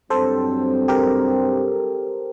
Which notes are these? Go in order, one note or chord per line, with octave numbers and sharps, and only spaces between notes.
G2 F#3 C4 A4 C5
G4 A#4